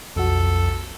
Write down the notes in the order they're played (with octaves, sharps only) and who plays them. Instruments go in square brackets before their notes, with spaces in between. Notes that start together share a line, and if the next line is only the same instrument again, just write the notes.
[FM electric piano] B1 F#4 [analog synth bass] F2 [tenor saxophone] A4